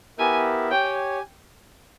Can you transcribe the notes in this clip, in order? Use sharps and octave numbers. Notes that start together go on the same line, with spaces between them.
B3 E4 G4 A#4 E5 G#5
G4 C#5 G5 G#5